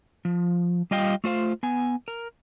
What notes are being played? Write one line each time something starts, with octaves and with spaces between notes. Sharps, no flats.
F3
G3 F4 D#5 F5 G5
A3 F4 C5 F5
B3 G#5
A#4